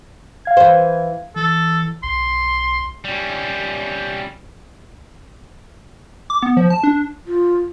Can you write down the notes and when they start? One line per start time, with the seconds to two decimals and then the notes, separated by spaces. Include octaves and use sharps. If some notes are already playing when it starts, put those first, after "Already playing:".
0.45 F5 G#6
0.57 E3 C5
1.36 E3 A4
2.03 B1 C6
3.05 G3 C#4
6.30 D6
6.43 B3
6.57 F3
6.70 A5
6.83 D4
7.27 F4